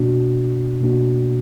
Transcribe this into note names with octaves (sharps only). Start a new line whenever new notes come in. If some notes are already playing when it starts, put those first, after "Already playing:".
Already playing: B2 A#3 D4 F#4
B2 A#3 D4 F#4